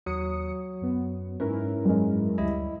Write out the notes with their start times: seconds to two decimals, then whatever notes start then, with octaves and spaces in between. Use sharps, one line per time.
0.06 D#2 F#3 D#6 C#7
0.82 F#2 B3
1.40 G#2 C#4 E4 A#4 B4
1.85 F#2 G#3
2.38 D2 G3 E4 D#5